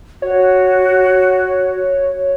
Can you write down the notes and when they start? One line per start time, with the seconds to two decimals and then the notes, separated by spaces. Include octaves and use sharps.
0.22 F#4 C#5